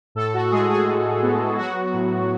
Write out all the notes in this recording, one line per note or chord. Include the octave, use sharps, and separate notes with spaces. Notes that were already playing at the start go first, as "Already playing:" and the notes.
A2 A4
F#4
F#4
G#3 G#4
G#4
A2
B3
F#3 F#4
A2